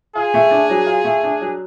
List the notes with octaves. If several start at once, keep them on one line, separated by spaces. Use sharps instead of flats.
F4 G#4
A3
D4
F#3
F4
A3
D4
F#3